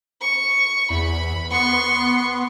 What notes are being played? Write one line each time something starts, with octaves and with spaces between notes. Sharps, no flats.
C#6
E2 B5
B3 C6 C#6